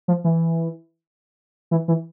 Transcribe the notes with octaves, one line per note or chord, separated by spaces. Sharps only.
F3
E3
E3
E3